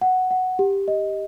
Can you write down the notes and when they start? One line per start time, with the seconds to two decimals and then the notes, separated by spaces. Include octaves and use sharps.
0.01 F#5
0.31 F#5
0.59 G4
0.88 D#5